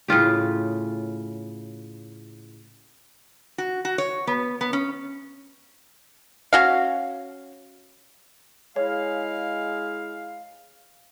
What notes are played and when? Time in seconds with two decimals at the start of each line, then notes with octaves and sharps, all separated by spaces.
0.08 A2 C#3 F4 G4
3.58 F#4
3.85 F#4
3.98 C#5
4.27 B3
4.61 B3
4.73 C#4
6.53 C#4 F#4 F5
8.76 G#3 E4 C#5 F5